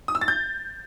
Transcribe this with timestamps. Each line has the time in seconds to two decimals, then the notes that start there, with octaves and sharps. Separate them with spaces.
0.08 D#6
0.15 E6
0.21 A6
0.28 G6